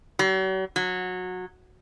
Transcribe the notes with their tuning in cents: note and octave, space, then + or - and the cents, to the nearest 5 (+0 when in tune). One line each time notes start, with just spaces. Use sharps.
F#3 +45
F#3 -20